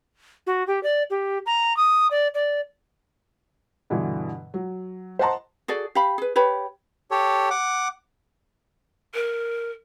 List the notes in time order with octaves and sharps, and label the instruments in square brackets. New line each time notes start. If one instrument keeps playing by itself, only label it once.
[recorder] F#4
G4
D5
G4
A#5
D#6
D5
D5
[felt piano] G2 B2 D3 E3
F#3
C5 D#5 F#5 A5 A#5 C6
[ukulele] F#4 G#4 A4 D5
G4 F5 B5
G#4 B4
G4 B4 C#5 B5
[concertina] G4 A4 C#5
F#5 D6
[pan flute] A#4